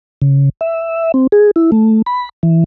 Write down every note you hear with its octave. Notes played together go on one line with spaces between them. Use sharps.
C#3
E5
C4
G#4
E4
A3
B5
E3